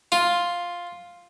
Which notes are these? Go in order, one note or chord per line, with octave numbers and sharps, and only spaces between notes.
F4